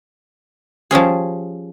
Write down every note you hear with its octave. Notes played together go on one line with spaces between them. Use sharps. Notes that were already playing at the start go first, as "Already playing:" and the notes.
F3 G3 C#4 G#4